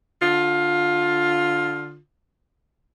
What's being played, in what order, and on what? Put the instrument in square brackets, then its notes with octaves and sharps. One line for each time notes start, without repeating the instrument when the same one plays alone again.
[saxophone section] D3 F4